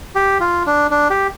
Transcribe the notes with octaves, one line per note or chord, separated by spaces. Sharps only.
G4
F4
D4
D4
G4